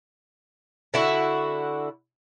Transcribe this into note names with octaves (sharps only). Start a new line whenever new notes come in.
D3 E4 F#4